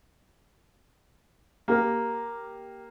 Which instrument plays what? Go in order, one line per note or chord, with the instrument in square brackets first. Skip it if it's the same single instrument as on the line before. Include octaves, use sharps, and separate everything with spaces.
[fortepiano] A#3 [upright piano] G4 A#4